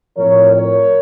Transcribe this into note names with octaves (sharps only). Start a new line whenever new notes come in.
A2 F3 C4 A#4 C#5
A#4 C#5